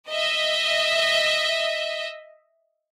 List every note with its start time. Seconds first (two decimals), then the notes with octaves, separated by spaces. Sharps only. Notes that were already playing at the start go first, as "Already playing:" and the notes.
0.11 D#5 E5